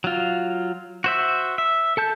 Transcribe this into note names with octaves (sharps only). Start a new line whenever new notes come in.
F#3 F4
F#4 C5 E5
E5
A4 A5 G6